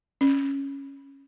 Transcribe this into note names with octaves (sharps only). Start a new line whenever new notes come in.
C#4